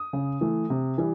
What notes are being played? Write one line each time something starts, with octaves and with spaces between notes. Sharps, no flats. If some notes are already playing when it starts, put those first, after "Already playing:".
Already playing: D#6
C#3
E3 A3
C3
E3 G3